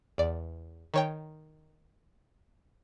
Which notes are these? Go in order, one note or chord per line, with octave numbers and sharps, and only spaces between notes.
E2 D5
D#3 C#5 G5